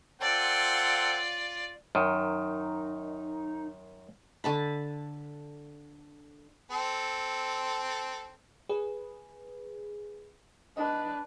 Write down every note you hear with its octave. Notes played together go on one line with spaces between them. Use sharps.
C4 F4 A4 D5 F#5
F#2 D#3 D#4
D3 A5 B5
C4 A4
G#4 B4
D4 B4 D#5